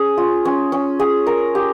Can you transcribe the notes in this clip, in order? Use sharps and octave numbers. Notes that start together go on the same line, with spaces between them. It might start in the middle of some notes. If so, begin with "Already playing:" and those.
Already playing: C#4 G#4
F4
C#4
C#4
G#4
A#4
G4